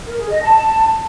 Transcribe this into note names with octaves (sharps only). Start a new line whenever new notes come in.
A#4
G#4
D#5
A5